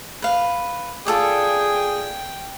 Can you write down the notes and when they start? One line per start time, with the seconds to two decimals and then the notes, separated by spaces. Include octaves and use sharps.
0.22 B4 F5
1.07 F4 G#4 A4 D5 G5